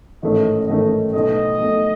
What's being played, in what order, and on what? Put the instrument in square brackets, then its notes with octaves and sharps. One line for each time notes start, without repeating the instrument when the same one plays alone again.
[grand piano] A1 G#2 D#3 A3 C#4 [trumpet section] D#5
[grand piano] A1 G#2 D#3 A3 C#4
[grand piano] B1 B2 A3 [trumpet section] D#5
[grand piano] B1 B2 A3